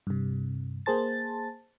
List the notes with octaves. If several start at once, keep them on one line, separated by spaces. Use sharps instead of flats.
G2 C3
A#3 G#4 C5 A5 A6